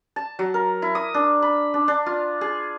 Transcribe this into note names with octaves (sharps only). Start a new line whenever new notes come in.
A5
F#3
A#4
E4
D#6
D4
B5
D4
D4
F4
G#4